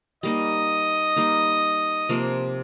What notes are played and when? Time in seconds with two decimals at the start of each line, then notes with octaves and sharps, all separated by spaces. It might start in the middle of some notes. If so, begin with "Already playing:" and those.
0.23 G3 A#3 D#4 D#5
1.16 G3 A#3 D#4
2.09 C3 F3 A#3